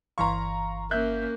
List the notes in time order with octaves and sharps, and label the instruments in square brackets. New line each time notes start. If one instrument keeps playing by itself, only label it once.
[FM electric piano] G1 E3 F5 [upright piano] A#5 C6 C#6
[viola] A#3 C#4 [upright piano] E5 F#6 G6